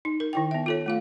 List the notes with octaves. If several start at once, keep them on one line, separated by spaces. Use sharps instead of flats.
D#4
A#4
D#3 E4 G5
B3 E5
F4 A4 C#5
A3 F4 F5